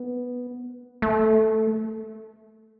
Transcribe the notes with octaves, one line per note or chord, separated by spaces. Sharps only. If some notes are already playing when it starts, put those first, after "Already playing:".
Already playing: B3
A3